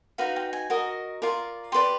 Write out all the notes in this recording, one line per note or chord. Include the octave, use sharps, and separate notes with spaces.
D#4 F#4 B4 F5
G5
G#5
F#4 A#4 D#5
F4 A#4 D5
G4 B4 D5 C6